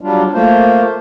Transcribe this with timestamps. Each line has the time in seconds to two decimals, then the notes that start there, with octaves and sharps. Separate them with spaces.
0.01 F#3 G3 D4 F4
0.34 A3 A#3 F4 C5